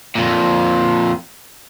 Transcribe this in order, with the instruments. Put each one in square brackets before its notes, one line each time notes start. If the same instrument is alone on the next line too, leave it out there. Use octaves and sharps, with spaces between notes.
[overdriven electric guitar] F2 A#2